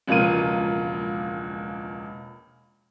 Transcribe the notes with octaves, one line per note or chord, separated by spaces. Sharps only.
E1 C#2 F3 A#3 D#7